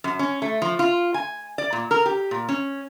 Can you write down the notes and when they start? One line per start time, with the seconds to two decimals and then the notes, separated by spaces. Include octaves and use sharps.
0.04 F#2
0.19 C#4
0.42 A3
0.62 F3
0.79 F4
1.14 G#5
1.58 D5
1.73 A#2
1.91 A#4
2.06 G4
2.31 A#2
2.49 C#4